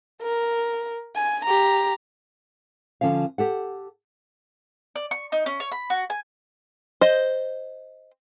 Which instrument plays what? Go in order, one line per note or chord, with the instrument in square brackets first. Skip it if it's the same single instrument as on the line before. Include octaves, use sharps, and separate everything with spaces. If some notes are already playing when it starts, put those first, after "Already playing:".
[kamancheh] A#4
G#5
G4 A#5
[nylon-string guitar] D3 F3 C#4 F5
G4 A4 F#5
[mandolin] D5
C#6
D#4
C#4
C#5
B5
F#4
G#5
[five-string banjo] C5 D#5